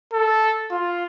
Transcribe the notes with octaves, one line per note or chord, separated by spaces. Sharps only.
A4
F4